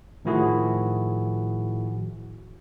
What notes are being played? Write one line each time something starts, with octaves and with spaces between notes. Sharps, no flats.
A2 D#3 F3 E4 F#4 G#4